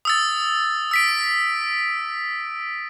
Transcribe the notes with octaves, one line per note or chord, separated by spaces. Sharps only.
D#6 E6 A6
E6 B6 D7